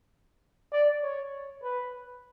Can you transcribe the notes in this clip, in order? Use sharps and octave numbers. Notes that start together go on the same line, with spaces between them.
D5
C#5
B4